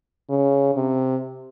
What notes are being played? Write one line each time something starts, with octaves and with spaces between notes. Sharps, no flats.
C#3
C3